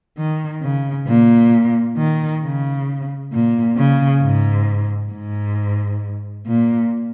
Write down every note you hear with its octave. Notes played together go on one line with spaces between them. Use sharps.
D#3
C#3
A#2
D#3
C#3
A#2
C#3
G#2
G#2
A#2